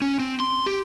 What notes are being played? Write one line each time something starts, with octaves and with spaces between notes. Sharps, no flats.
C#4
C4
C6
G4